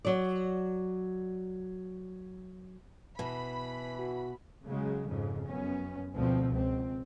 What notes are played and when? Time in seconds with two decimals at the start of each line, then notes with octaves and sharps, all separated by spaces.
0.05 F#3 D5
3.19 B2 E3 B5
3.99 F#4
4.66 C#3 F#3 G#3
5.07 F2 G#2 C#3
5.48 F#2 B3 C#4
6.15 D2 B2 F3 C4
6.52 C#2 C4